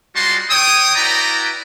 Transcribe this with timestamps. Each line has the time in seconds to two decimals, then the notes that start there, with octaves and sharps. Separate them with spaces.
0.15 G3 G#3 F4 F#4 A5 C6
0.50 C#5 G5 D#6
0.95 E4 F#4 B4 D5 G5 A#5